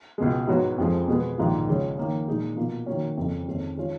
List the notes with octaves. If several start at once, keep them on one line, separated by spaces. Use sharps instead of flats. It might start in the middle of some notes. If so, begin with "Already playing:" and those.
C#2 B2 G#3
G#2 F#3 B3 F#4 C#5
F2 F3 G#3
B2 G#3 B3
A#1 G#2 D#3 A#3 F4
C#2 C#3 G#3 C#4
D#3 A#3 C#4
A#2 G#3 D#4 G#4
B2 A#3 F4
D#3 F#3 A#3 C#4
F2 C#3 F3
F2 D#3 G#3 C#4
D#3 G#3 C#4 F4